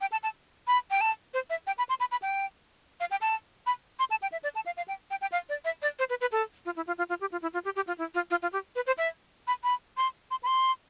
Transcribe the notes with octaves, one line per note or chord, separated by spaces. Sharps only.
G5
A5
A5
B5
G5
A5
C5
E5
G5
B5
C6
B5
B5
G5
F5
G5
A5
B5
C6
A5
G5
E5
D5
A5
F5
F5
G5
G5
G5
F5
D5
E5
D5
C5
B4
B4
A4
F4
E4
F4
F4
F4
G4
F4
E4
F4
G4
G4
F4
E4
F4
F4
F4
G4
B4
C5
E5
B5
B5
C6
C6
B5
C6